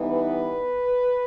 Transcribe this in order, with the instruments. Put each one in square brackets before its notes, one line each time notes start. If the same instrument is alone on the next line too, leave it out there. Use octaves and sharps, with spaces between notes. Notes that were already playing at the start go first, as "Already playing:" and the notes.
Already playing: [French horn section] E3 G3 B3 D#4
B4